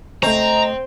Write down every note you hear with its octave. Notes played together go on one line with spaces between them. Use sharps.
C#2 A3 C4 D#5 A#5